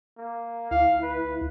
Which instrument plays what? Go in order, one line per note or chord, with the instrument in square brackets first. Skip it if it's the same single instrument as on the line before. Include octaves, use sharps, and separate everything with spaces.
[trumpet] A#3
[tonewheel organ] D2 E4 [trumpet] F5
[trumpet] B4